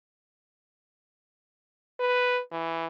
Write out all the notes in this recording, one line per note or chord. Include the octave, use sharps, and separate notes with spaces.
B4
E3